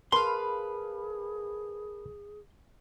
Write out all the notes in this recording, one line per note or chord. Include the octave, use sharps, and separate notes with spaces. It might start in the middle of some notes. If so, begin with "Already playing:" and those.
G#4 A#4 B4 F5 A5 B5 C6